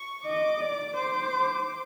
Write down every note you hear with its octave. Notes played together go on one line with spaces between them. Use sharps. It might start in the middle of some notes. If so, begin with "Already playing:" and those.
Already playing: C#6
D#5 D6
D5
C5 D6